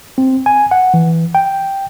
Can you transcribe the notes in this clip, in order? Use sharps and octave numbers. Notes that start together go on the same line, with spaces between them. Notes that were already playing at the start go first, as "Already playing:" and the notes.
C4
G#5
F#5
E3
G5